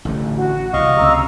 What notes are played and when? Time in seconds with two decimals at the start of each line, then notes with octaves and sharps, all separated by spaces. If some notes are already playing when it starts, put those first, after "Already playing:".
0.05 A1 D3 A3
0.34 F#4
0.73 C2 E3 D#5 F5 C#6
0.97 C#2 C3 A#5 E6